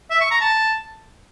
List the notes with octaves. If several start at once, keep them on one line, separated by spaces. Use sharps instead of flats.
E5
C#6
A#5
A5